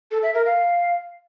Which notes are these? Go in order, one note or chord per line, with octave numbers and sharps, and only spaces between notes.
A4
E5
A#4
F5